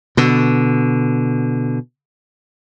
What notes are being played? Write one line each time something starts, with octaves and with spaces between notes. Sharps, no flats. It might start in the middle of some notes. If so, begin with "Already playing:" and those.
B2 D3